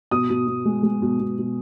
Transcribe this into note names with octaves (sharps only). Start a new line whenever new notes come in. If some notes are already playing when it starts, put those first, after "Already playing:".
B2 D#6
B2
B2
G#3
G#3
B2
B2
B2